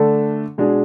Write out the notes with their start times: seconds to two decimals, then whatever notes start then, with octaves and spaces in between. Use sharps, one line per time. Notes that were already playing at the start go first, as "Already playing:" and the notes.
Already playing: D3 A3 D4 A4
0.58 B2 G#3 D4 G#4